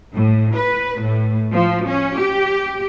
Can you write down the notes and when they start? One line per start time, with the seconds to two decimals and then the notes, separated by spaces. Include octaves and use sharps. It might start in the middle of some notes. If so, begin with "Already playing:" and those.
0.15 A2
0.55 B4
1.01 A2
1.54 F3
1.87 C#4
2.17 G4